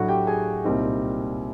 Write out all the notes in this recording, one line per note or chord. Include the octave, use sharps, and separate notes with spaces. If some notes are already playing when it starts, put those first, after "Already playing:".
Already playing: A2 F#3 A3 D4 F#4 F#5
G4 G5
G#4 G#5
C2 A#2 G3 C4 D#4